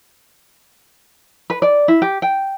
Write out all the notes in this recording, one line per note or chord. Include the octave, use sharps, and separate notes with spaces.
B4
D5
E4
G4
G5